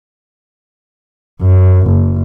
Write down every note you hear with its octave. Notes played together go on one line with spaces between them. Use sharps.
F#2
F#1